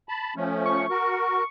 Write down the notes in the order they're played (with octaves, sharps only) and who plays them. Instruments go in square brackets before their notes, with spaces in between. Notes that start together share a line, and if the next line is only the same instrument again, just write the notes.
[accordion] A5 B5
F3 A3 C#4
[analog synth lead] C#6
[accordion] F#4 A#4